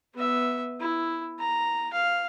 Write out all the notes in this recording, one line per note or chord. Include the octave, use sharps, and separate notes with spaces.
B3 E5
E4
A#5
F5